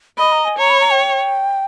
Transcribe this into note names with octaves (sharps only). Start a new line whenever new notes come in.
D#5 B5
A#5
G#5
C#5 A#5
B5
A#5
G5